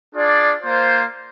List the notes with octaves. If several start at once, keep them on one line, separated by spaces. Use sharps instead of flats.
D4 F4 G#4 D5
A#3 F4 C5